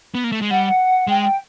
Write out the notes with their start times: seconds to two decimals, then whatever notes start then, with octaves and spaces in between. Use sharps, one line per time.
0.15 B3
0.24 A#3
0.32 A3
0.42 G#3
0.50 G3 F#5
1.07 G#3 G5